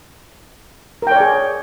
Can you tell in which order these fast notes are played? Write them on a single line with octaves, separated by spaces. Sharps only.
A#4 G5 C#5 D5 G#4